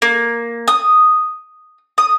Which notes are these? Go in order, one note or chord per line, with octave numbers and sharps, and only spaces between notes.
A#3
D#6
D#6